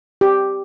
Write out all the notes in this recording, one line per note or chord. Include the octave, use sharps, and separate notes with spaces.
G4